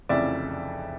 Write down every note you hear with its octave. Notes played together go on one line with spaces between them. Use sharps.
F1 F2 C#3 E3 D5 E5